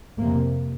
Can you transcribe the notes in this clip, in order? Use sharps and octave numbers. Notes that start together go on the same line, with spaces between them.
F2 C3 A#3